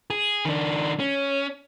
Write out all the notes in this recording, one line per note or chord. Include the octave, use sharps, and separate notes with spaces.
G#4
D#3 D4
C#4